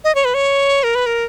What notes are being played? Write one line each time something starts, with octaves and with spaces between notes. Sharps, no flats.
D#5
C#5
B4
C#5
A#4
B4
A#4